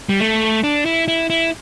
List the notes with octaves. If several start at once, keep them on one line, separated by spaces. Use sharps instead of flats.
G3
A3
D4
E4
E4
E4